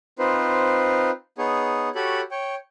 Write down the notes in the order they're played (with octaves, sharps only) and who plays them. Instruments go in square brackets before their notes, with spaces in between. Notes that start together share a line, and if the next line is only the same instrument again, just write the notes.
[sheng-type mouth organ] C4 D#4 F4 B4 C5
B3 D#4 G#4 C#5
F#4 G4 A4 C#5 B5
C#5 G5